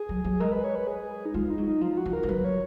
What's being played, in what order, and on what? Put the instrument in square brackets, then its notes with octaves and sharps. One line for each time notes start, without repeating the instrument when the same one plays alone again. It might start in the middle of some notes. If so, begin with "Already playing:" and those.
Already playing: [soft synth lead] G#4
[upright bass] F#3
F#3
[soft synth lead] G#4
[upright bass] G#3 [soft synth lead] A#4
[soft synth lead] B4
C#5
B4
G#4
D#4
[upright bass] G#3 [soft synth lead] F4
[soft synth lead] D#4
[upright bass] F#3
[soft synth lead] D#4
[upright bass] F3 [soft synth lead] F4
[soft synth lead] F#4
[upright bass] F3
[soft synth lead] A#4
[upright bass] F3
[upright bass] F#3 [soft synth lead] B4
[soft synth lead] C#5